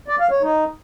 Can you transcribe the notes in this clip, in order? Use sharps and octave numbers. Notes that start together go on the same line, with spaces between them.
D5
F5
C#5
D#4